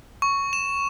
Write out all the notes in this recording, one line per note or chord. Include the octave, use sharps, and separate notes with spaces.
C#6
E7